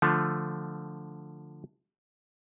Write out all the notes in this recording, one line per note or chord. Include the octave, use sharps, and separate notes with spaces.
D3 F3 A3 F4